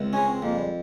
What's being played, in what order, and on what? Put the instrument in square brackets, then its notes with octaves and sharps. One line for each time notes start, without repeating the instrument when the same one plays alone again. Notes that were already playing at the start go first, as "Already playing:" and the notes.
Already playing: [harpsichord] C#2 C3
[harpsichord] G#3 [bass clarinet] C#4
[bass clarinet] C4
[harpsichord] F2 [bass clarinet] A#3
[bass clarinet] G3